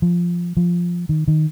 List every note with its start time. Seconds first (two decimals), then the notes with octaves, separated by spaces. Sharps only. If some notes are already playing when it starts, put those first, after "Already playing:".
0.02 F3
0.57 F3
1.09 D#3
1.28 D#3